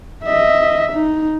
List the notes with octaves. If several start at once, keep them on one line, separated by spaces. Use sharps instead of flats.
D#5 E5
D#4